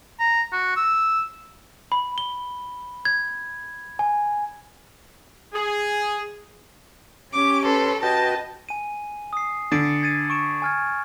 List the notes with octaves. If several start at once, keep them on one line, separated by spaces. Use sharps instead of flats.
A#5
F#4
E6
B5
G7
G#6
G#5
G#4
C#4 G4 D6
A4 B4 C6
F#4 B4 D#5 G5 A5
G#5 D#7
D#6 C7
D3 A6 C#7 D7
G#6 A6 D#7
C#6 D7 E7
G#5 F6 G#6